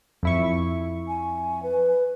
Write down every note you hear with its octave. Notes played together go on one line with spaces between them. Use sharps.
F2 E4 C#6
G#5
B4